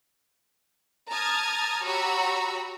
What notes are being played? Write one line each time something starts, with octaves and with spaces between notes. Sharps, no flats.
A5 A#5 D#6 F6 G#6 A6
F#4 G4 C#5 A#5 B5 E6